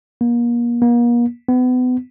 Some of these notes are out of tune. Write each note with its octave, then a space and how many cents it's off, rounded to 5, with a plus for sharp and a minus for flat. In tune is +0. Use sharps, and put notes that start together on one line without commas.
A#3 +35
A#3 +40
B3 +30